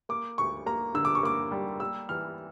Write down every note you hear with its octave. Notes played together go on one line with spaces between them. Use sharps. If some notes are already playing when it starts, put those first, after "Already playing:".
A#3 D6
D2 C#6
A#3 A#5
D3 E6
D6
C#6
A#3 D6
G3
A#3 E6
E3 F6